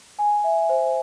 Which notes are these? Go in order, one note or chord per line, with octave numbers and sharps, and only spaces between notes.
G#5
E5
C5